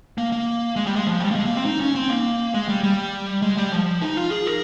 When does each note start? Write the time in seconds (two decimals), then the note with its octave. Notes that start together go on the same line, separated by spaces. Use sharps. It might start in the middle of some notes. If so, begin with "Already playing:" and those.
0.18 A#3
0.32 A#3
0.76 G#3
0.86 G3
0.96 G#3
1.07 F3
1.20 G3
1.31 A#3
1.35 G#3
1.45 A#3
1.55 C4
1.65 D#4
1.80 C#4
1.95 C4
2.10 A#3
2.54 G#3
2.68 G3
2.83 G3
3.42 G#3
3.57 G3
3.72 F3
4.02 D#4
4.17 F4
4.31 G#4
4.46 A#4